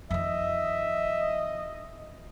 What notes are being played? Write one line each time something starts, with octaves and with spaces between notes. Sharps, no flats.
F2 D#3 D#5 E5